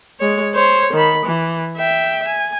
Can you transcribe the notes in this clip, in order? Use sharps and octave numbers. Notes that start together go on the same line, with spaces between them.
G#3 C#5
C5 C#5
D#3 B5
E3
E5 G5
G#5